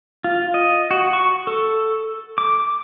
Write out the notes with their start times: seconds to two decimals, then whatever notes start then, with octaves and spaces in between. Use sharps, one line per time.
0.24 F4
0.54 D#5
0.91 F#4
1.13 C#6
1.47 A4
2.38 D6